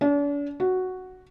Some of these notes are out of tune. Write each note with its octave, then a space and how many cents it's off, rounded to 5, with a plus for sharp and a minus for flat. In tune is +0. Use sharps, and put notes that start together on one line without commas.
D4 -40
F#4 +0